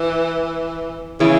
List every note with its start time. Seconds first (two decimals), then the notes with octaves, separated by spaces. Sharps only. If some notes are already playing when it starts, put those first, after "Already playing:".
Already playing: E3
1.20 C#3 E3 E4